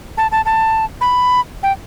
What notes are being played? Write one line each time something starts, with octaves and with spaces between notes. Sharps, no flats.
A5
A5
A5
B5
G5